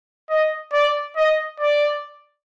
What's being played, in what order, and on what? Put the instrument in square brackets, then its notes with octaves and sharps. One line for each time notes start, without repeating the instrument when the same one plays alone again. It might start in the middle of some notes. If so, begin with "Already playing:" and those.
[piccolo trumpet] D#5
D5
D#5
D5